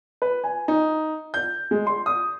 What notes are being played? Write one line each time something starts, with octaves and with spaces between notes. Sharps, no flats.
B4
G#5
D#4
G6
G#3
C6
D#6